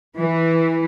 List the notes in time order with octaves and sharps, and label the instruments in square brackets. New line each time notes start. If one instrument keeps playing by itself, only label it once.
[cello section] E3